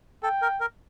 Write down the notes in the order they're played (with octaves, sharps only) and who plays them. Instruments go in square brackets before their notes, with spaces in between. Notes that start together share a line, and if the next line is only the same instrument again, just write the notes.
[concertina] A4 [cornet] G5
[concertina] A#4
A#4